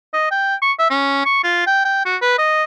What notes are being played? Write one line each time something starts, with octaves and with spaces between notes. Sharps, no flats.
D#5
G5
C#6
E5
C#4
C#6
F4
G5
G5
F#4
B4
D#5